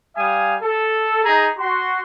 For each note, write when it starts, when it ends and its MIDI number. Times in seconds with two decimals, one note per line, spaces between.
0.17 0.55 55
0.17 0.55 77
0.17 0.55 80
0.17 0.55 87
0.62 1.22 69
1.25 1.51 63
1.25 1.51 68
1.25 1.51 82
1.58 2.01 66
1.58 2.01 84